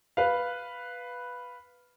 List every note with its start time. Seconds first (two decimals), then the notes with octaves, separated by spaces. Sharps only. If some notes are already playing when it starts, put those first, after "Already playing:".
0.17 B4 F5